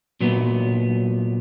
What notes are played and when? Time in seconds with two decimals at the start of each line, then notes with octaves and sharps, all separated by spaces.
0.21 A#2 F#3 B3